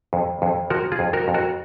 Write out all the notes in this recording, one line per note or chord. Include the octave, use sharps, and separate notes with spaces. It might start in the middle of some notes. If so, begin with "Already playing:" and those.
F2
F2
F3 F#4 A#4
F4 G#4
F2
F#4 A#4
F2
F#4 A#4